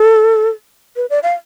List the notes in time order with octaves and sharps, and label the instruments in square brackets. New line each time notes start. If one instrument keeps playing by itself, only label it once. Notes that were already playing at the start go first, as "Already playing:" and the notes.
Already playing: [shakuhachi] A4
B4
D5
F5